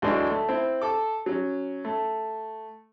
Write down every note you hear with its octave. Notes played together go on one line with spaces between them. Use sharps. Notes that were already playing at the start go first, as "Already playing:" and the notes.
D2 E3 F#3 G#3 D4
A3
C4 E4
A4 D6
F#3 C#4
A3